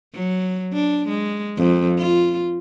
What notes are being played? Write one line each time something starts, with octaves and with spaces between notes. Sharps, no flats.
F#3
D4
G#3
F2
F4